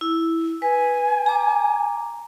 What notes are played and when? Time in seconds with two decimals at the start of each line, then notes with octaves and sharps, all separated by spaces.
0.01 E4
0.62 B4 G#5
1.26 A#5 D6